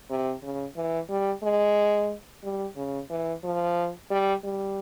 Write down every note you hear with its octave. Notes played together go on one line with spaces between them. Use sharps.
C3
C#3
E3
G3
G#3
G3
C#3
E3
F3
G3
G3